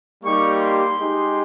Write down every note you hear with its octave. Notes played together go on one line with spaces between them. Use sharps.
G3 A#3 D#4 G4 C#6
C6
G#3 D#4 G4